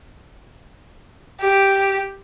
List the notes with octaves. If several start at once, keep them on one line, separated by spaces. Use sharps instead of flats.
G4